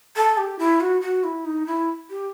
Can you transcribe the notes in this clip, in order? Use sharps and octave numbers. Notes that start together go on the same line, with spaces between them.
A4
G4
E4
F#4
F#4
E4
D#4
E4
G4